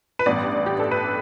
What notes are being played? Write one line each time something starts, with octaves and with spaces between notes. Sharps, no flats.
B4
A1 G2 G3 B3 D5
G4
A4
B4